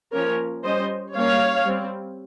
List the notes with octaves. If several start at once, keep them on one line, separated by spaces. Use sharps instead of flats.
F3 A#3 C#4 A#4 C#5
G3 C#4 C5 D#5
G3 A#3 C#4 C#5 F5
G3 C4